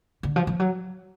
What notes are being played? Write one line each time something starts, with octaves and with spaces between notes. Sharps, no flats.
D3
F3
F3
F#3